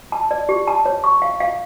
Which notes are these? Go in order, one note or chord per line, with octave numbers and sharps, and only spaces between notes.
A5
D5
G4
A5
C#5
C#6
F5
F5